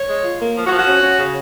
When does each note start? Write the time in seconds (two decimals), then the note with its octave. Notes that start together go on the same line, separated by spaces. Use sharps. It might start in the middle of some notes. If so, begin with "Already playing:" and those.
Already playing: C#5
0.09 G#3
0.24 F4
0.40 A#3
0.56 F3
0.67 F#4
0.71 F3
0.77 F#4
0.87 C#4
1.03 C#4
1.19 C#3